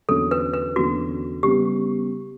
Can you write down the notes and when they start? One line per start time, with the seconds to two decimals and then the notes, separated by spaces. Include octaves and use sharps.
0.09 E2 D3 F#3 C#4 A4
0.31 B4
0.54 B4
0.76 E2 D3 F#3 C#4 F#4
1.43 C#3 G3 B3 G4